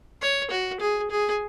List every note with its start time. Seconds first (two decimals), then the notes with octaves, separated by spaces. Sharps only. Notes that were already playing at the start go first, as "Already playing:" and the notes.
0.22 C#5
0.51 F#4
0.80 G#4
1.11 G#4